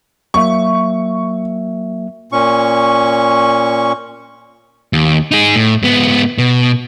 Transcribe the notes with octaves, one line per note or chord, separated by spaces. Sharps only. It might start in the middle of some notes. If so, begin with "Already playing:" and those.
F#3 A#3 E5 C#6
A#2 C#4 C#6
D#2
D#4 G#4
A2
G#2 B3
B2